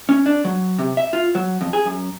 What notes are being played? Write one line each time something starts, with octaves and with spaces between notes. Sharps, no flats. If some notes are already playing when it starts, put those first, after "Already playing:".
C#4
D4
F#3
C3
E5
F4
F#3
F2
G#4
F#2